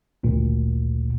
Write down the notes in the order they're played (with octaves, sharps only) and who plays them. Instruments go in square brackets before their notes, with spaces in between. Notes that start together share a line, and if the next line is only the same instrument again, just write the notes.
[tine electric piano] G#1 D2 A#2